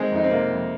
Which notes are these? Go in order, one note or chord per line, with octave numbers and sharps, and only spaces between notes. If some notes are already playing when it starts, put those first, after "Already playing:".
Already playing: D#3 G#3 C4
F2 D#4
C4
C3 A#3
F2